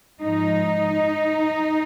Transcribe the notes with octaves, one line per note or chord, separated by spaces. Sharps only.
G#2 F3 D#4